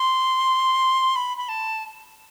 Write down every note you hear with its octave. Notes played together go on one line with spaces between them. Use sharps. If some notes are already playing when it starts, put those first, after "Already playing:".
Already playing: C6
B5
B5
A5